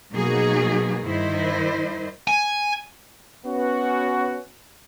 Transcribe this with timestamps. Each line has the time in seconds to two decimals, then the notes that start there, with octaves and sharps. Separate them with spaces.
0.12 B2 F#3 A#3 D#4 F#4 G#4
1.04 G2 D#3 E4 C5 D#5
2.28 G#5
3.46 B3 C#4 F#4